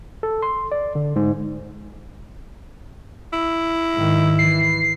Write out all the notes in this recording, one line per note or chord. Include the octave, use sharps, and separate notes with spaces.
A4
C6
D5
D3
G#2
E4
G#2 D#3
E3 C7